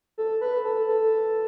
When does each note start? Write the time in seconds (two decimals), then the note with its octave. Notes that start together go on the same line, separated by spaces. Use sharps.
0.18 A4
0.41 B4
0.65 A4
0.88 A4